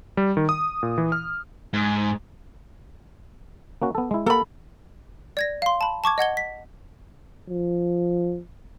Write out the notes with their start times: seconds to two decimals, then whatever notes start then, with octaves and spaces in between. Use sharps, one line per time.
0.17 G3
0.37 D#3
0.49 D#6
0.83 A#2
0.98 E3
1.12 F6
1.73 G#2
3.82 A#3 C#4 F#4
3.95 B3 A4
4.11 G#3 E4
4.26 A#3 A4 A#4 F#5 B5
5.37 D5 G#6 A#6
5.62 F5 C6
5.81 A5 B5
6.04 A5 C#6 D6 G#6
6.18 D#5 F#5 G#6 G7
6.37 B6
7.49 F3